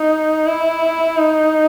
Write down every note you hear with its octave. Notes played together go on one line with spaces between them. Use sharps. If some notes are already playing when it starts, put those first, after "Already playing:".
Already playing: D#4
E4
D#4